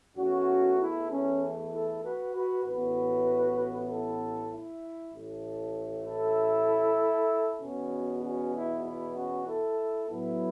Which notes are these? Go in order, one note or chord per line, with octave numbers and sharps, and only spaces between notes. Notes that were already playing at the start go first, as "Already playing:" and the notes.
E2 E3 A3 C#4 F#4
E4
C#4
E4 A4
F#4 B4
F#4 B4
A1 A2 E3 B3 F#4 B4
E4 A4
E4
A1 A2 A3
E4 A4
E2 B2 B3 C#4 F#4
C#4 F#4
E4
E4
C#4 F#4
E4 A4
A2 F#3 B3 E4